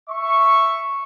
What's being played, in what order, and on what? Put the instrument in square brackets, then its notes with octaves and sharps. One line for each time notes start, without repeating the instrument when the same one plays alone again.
[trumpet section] E5 C#6